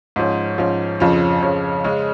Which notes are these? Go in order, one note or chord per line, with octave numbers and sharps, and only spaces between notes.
G#2 F3 C#4
G#2 F3 C#4
F2 C#3 F3 C#4
F2 C#3 F3 C#4
C#3 G#3 C#4